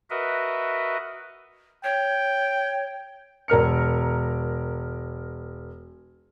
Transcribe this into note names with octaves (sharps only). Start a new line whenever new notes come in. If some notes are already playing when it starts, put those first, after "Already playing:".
F#4 A#4 B4 D#5 E5
C#5 G5
E1 A#4 F6 C#7